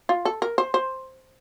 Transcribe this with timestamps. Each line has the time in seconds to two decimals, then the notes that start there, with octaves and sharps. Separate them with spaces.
0.09 F4
0.25 A4
0.42 A#4
0.58 C5
0.74 C5